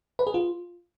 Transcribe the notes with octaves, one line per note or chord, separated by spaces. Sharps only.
B4
G#4
F4